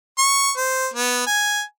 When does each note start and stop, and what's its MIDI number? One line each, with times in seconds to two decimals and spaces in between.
0.18 0.51 85
0.57 0.88 72
0.93 1.24 59
1.26 1.62 80